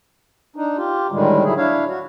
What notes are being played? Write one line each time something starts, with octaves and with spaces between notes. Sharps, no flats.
D4 D#4
F4 G4
A2 D3 D#3 G3 G#3
D3 F#3 E4 G#4
D4 E4 C#5 F5
F#4